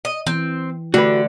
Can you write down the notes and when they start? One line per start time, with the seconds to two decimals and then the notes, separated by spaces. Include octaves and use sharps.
0.05 D#5
0.27 E3 C4
0.94 D3 A3 F#4 G4 B4 D5